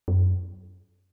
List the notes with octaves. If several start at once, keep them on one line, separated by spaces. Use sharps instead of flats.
F#2